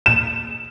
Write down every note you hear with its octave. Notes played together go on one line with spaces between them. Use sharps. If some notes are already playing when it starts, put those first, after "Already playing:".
E7